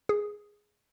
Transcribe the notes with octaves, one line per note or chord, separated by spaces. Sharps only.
G#4